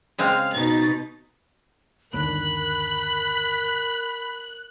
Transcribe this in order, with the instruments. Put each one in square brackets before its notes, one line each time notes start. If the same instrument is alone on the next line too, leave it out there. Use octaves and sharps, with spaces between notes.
[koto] C#3 G#3 C4 [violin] F5
[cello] B2 D#4 [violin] A6
[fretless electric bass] G1 D#2 D3 [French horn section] A#4 [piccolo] B5 [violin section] F#6